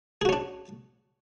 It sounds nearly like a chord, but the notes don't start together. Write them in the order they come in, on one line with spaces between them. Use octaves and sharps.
G#4 F#4 C#4 D4